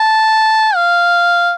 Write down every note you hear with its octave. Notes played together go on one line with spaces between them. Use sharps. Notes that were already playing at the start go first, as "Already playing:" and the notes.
Already playing: A5
F5